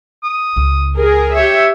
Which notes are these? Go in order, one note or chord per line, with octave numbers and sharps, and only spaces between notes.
D#6
C#2 C#3
G#4 A#4
G4 C#5 E5